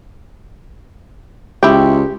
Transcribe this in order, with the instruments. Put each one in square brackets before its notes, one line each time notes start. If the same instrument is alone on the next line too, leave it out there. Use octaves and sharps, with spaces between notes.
[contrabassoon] C#2 [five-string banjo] E4 G5 [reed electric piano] G4